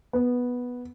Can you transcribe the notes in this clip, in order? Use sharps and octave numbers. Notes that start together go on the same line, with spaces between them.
B3